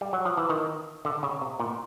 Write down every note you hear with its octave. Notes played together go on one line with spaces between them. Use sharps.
G3
F#3
F3
E3
D#3
D3
C#3
C3
A#2